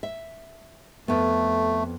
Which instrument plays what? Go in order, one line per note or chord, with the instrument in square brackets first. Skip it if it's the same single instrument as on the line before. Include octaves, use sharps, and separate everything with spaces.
[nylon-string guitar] E5
[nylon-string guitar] F2 B3 [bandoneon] A3